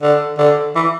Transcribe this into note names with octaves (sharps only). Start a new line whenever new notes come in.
D3
D3
E3